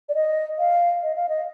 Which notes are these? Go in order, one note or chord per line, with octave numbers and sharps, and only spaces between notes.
D5
D#5
F5
D#5
F5
D#5